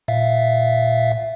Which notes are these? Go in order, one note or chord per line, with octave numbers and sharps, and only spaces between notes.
A#2 E5 F5